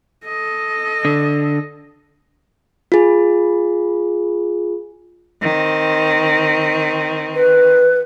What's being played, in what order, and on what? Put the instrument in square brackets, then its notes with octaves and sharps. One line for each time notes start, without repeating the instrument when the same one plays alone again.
[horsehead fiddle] A4 D#5
[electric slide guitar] D3
[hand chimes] F4 G#4
[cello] D#3 C4
[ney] B4